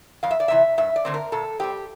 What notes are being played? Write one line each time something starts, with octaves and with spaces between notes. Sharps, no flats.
F2 F5
E5
D5
C3 E3 E5
G2 E5
D5
D3 A3 C4
A#4
A#2 A4
G3 C4 G4